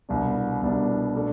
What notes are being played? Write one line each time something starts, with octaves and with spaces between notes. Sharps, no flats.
C2 B2 G3 D4
C2 B2 G3 D4
B2 A3 D4 A4